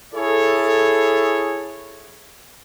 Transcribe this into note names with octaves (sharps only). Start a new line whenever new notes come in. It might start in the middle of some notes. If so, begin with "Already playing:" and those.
E4 G#4 A4 C#5